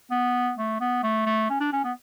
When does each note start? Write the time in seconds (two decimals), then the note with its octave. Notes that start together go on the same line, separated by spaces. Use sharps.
0.11 B3
0.58 A3
0.80 B3
1.03 A3
1.26 A3
1.50 C#4
1.60 D4
1.73 C#4
1.84 B3